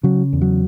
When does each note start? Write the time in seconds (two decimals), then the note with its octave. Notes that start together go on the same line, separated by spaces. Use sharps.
0.03 C#3 F#3
0.33 E2
0.41 F#3